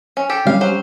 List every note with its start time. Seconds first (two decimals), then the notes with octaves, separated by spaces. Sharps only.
0.17 C#4
0.30 G4 A4
0.47 G3 C#4 G4 F5
0.61 F#3 C5